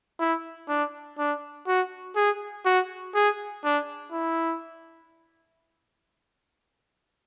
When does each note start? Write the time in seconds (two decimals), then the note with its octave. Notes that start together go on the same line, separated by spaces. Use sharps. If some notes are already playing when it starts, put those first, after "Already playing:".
0.20 E4
0.69 D4
1.18 D4
1.67 F#4
2.16 G#4
2.65 F#4
3.15 G#4
3.64 D4
4.12 E4